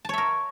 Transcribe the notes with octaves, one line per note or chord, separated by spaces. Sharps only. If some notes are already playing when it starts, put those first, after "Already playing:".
A#4 C#5 E5 A5